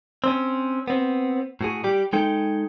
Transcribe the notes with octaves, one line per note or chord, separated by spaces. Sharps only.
C4 C#4
B3 C4
A2 F#4 G#4
G3 G4
G#3 D#4 A4 G5